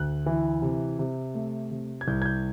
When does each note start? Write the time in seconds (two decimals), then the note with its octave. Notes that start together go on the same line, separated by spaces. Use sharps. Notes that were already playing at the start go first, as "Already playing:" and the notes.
Already playing: D2 F#6
0.26 E3
0.62 C3
0.99 C3
1.35 A3
1.71 C3
2.01 G#6
2.08 C2 G6
2.22 G#6
2.26 G6